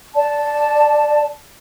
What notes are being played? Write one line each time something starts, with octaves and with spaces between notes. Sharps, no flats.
D5 A5